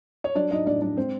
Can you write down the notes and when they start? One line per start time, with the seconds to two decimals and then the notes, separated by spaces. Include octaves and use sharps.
0.24 C#5
0.35 F#3 D4 D5
0.51 F#3 D#4 D#5
0.66 A2 D4 D5
0.81 F#3 D4 D5
0.97 G#3 C4 C5